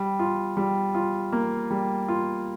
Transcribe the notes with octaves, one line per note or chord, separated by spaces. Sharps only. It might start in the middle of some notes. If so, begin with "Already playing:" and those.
Already playing: G3
F4
G3
F4
A#3
G3
F4